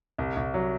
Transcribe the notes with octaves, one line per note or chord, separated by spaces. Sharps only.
C2
C2
F#3